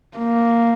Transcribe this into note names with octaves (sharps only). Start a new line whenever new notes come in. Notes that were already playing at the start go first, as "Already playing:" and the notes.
A#3